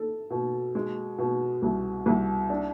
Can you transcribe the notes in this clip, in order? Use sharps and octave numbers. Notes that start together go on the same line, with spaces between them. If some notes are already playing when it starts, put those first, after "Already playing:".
Already playing: A4
B2
G#3
B2
C2
C2
D4